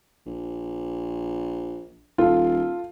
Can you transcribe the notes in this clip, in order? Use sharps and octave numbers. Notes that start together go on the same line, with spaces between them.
A#1
D#1 F4 A4